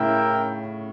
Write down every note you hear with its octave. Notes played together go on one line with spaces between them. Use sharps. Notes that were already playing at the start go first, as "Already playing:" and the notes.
Already playing: A2 C#3 E4 A#4 E5 G5